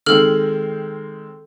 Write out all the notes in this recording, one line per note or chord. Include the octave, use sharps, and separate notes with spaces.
D#3 G#3 C4 A4 F6